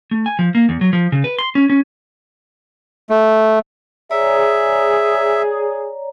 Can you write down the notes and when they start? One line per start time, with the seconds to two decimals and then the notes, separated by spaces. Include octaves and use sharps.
0.11 A3
0.26 G#5
0.39 F3
0.55 A#3
0.69 E2
0.81 F#3
0.93 F3
1.12 C#3
1.24 B4
1.39 C6
1.55 C#4
1.70 C#4
3.10 A3
4.11 G#4 C#5 D5 E5 A#5